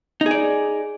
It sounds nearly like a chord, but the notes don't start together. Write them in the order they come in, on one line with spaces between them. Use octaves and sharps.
D#4 G#4 D5